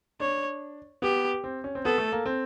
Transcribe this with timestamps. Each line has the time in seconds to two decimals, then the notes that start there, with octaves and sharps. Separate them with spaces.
0.20 D4 C#5
1.02 B3 G4
1.44 C4
1.64 C#4
1.75 C4
1.85 B3 A4
1.98 A3
2.12 A#3
2.26 C4